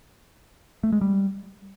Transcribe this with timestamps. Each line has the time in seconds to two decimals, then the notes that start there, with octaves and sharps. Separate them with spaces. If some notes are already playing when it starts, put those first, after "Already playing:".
0.83 A3
0.92 G#3
1.01 G3